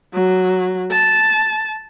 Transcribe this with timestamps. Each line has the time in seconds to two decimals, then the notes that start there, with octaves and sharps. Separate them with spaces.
0.14 F#3
0.91 A5